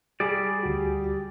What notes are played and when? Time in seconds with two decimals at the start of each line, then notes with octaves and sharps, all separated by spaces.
0.20 G3 G#4 D5
0.63 D2 F#4 G4